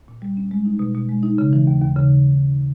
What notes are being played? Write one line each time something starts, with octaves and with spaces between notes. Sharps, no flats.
A#2
G3
C#4
G#3
D#4
B2
B2
G#3
D#4
C#3
E3
D#2
D#2
C#3